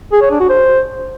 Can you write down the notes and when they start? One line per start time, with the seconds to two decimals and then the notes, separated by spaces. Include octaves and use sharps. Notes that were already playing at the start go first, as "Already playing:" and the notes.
0.12 G#4
0.22 C#5
0.31 D4
0.40 F#4
0.49 C5